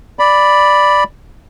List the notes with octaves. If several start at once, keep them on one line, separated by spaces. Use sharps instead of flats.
D5 B5